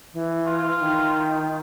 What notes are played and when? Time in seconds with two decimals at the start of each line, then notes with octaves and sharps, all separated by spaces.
0.14 E3
0.46 F4
0.80 D#3